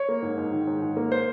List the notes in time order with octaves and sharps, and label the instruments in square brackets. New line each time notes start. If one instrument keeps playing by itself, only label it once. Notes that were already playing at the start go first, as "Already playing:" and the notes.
Already playing: [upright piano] C#5
A#3
G#2
G#2
D#3
G#2
G#2
A#3
C5